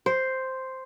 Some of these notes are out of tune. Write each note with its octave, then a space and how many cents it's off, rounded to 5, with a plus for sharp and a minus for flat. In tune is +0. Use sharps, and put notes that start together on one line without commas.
C5 +0